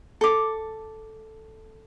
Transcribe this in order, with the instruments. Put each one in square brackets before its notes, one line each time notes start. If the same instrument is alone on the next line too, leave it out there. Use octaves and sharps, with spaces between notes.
[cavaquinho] A4 D6